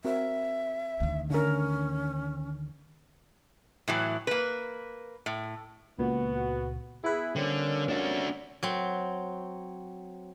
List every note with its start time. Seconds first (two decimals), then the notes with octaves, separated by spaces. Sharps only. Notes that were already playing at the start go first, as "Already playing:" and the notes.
0.05 C4 F#4 A#4 E5
1.00 D2 D#3
1.30 D3 C#4 A#4
3.88 A2 E3 F#3
4.27 A#3 B4
5.26 A2
5.99 C#2 A#2 B3 F#4
7.04 B3 E4 G#4 B4
7.36 D3 G3 A#3 C4 C#4
7.89 D4 F#4
8.63 F#3 C4